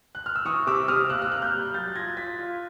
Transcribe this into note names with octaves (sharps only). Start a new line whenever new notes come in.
F#6
F6
E6
E3 C#6 D#6
C3 D6 E6
C3 D#6 F6
A#3 E6 F#6
F6
A#3 F#6
F6 G6
G3
F#3 G6 A6
A6
F4 G#6 A#6
F4 A6 B6
F4